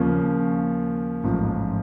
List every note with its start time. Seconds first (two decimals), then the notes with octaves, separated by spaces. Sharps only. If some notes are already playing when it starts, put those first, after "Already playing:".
Already playing: D#2 C#3 F3 A#3 C#4
1.24 A1 G#2 F3